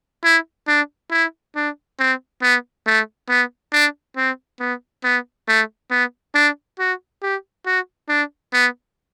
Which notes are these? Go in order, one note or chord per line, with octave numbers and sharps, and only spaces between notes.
E4
D4
E4
D4
C4
B3
A3
B3
D4
C4
B3
B3
A3
B3
D4
F#4
G4
F#4
D4
B3